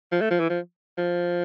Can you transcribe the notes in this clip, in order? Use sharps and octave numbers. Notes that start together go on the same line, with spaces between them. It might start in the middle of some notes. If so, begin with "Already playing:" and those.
F3
A3
F3
E3
F3
F3